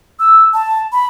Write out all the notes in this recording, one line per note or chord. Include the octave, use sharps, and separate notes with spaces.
E6
A5
B5